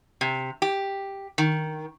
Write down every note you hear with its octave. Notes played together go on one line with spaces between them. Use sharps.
C3
G4
D#3